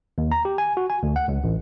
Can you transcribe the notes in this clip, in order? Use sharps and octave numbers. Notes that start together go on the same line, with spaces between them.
D#2
A#5
G4
G#5
F#4
G#5
D2
F#5
C#2
A1